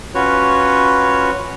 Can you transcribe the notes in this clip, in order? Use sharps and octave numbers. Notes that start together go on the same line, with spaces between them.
C#4 F4 F#4 B4 C#5